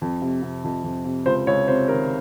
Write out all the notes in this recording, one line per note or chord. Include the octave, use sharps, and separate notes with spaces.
F2
C3
C3
F2
F2
C3
C#2 C5
C#2 C#5
C3 C5
D#3 A#4